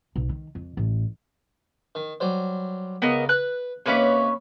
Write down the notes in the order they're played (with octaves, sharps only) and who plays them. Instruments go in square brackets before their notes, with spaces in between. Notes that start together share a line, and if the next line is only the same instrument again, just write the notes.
[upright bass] B1
D#3
F2
A1
[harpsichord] D#3
F#3 G3 C5
[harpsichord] C#2 [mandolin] B3 A#4 D#5
[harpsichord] B4 [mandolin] F#6
[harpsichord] C3 A#3 D#4 [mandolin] C#4 B4 C#5